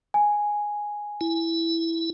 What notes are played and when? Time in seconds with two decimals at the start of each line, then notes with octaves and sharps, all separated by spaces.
0.14 G#5
1.21 E4